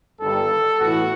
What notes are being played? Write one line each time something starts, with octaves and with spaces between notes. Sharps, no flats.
G1 G2 D#3 G3 A4
A2 E3 B3 E4 F#4